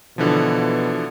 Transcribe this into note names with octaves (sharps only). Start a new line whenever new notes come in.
B2 D3 E3 F3